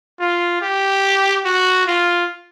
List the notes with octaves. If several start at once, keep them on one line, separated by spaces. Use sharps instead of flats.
F4
G4
F#4
F4